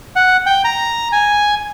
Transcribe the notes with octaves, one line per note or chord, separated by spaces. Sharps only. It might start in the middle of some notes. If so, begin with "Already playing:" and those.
F#5
G5
A#5
G#5